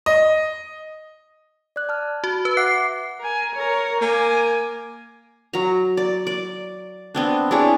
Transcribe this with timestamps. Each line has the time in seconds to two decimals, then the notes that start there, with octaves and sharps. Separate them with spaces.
0.06 D#5
1.76 D5 F#6
1.89 A5 F6
2.24 F#4
2.45 B4
2.57 E5 F#5 D6 F#6 C7
3.20 A#4 G#5
3.55 A#4 C#5
4.01 A#3 G#5 D6
5.53 F#3 A#5
5.97 D5
6.27 D5
7.15 B3 C4 D4
7.51 D4 E4 G#4 C#5